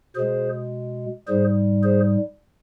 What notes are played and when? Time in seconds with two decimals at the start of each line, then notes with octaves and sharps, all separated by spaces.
0.15 B2 G#3 G#4 C5
1.27 G#2 G3 G#4 C5
1.83 G#4 C5